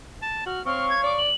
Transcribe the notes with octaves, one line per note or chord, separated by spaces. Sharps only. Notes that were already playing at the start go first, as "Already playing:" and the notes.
A5
F#4 F6
C4 C#5 F5 C#6 F6
G#6
D5 D6
F#7